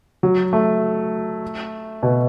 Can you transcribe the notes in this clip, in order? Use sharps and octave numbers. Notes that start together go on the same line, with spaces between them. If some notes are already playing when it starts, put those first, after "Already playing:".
F#3
A3
B2